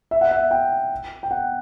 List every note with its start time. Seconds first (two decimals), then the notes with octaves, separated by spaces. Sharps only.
0.11 E5
0.21 F#5
0.31 E5
0.51 G5
1.23 G5
1.31 F#5